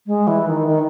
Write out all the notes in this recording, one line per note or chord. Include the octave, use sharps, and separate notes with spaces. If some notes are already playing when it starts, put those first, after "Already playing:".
G#3
E3
D#3
D#3